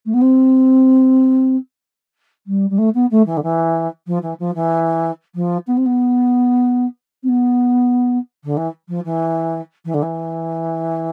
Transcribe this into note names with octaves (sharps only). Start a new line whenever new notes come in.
A3
B3
C4
G3
G3
A3
B3
A3
E3
D3
E3
F3
E3
F3
E3
F3
B3
C4
B3
C4
B3
D3
E3
F3
E3
E3
D3
E3